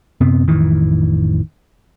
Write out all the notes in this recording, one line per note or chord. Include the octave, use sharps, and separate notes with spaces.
F#2 C3 B3 C4
A1 F2 D#3 E3